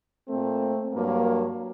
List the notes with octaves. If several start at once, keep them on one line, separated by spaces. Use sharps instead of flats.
A#2 A3 C4
G2 F#3 A#3